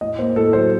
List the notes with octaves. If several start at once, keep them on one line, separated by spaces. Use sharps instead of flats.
A2 D#5
A#3 C5
A2 A4
F#3 C5